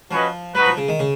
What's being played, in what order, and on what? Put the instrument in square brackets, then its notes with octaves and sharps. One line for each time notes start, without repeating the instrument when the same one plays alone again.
[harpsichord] F3 [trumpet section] C#4 F#4 B4 D#5
[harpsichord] F#3 [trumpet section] D#4 F#4 B4
[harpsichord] F3
C#3
D#3
C#3